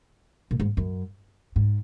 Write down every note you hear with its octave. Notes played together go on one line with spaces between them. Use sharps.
A#2
G#2
F#2
G#2